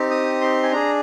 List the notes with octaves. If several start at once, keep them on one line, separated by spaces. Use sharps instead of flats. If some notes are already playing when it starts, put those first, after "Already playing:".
Already playing: C4 D#4 G4
D#6
C6
G#5
D4 G#4 A#5